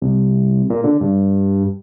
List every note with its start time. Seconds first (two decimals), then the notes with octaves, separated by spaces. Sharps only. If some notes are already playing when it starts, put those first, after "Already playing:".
0.02 C2
0.70 A#2
0.84 D3
1.01 G2